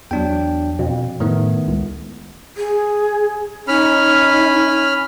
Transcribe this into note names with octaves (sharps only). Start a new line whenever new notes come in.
E2 F#3 D4 G5
F2 B2
A2 D#3 A3 B3
C#2
G#4
C#4 D#4 B5 F6